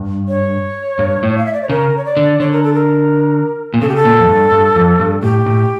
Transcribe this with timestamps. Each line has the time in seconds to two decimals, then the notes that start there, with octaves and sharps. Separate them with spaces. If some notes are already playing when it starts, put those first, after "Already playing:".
Already playing: G2
0.28 C#5
0.99 G2
1.23 A2
1.38 F5
1.46 E5
1.53 D5
1.62 C#5
1.69 C#3 A#4
1.97 C#5
2.05 D5
2.17 D3
2.40 D3 C#5
2.52 A#4
2.63 A4
2.74 A#4
3.74 A#2
3.81 C#3 A4
3.89 G4
3.96 A4
4.05 A#2
4.19 F2
4.29 G2
4.51 G2
4.76 F2
4.99 G2
5.22 A2 G4
5.46 A2